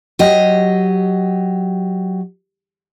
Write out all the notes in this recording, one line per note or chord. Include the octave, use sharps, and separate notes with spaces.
F#3 G4 D#5